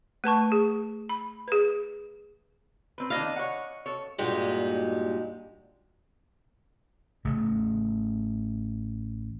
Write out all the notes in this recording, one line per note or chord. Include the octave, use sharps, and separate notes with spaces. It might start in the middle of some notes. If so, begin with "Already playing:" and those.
A3 B4 A5 C#6
G#4
B5
G#4 B4
C4 B4
D#3 D4 D#5 F5
C#5 F#5
A4 C#5
G2 A#2 G#3 D#4 F#4 G4
A1 C#3 A3